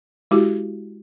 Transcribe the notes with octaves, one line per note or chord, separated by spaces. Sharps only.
G#3 E4 F#4 G4